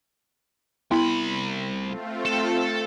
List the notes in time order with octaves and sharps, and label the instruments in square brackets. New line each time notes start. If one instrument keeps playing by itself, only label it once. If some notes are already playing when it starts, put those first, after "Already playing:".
[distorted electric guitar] C2 B5 [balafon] B3 E4
[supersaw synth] A3 C4 F4
[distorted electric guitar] A4 A5